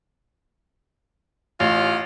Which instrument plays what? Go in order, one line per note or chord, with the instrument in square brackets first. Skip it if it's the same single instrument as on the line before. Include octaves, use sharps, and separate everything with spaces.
[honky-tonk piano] A1 [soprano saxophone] F4